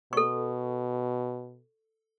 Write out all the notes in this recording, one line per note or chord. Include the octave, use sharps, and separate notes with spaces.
B2 A4 C#6